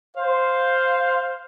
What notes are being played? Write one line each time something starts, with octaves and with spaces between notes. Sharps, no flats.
C5 F5